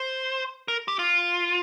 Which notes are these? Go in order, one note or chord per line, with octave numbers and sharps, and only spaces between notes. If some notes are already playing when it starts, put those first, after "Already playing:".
Already playing: C5
A#4
G4
F4